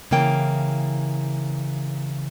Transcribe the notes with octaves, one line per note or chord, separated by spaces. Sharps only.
C#3 E3 A#3 G5